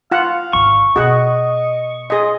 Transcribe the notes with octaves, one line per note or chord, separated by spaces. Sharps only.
F4 F5 F#5
G#1 D2 C#6
B2 F#4 G#4 D#5 F#5
F4 G#4 D#5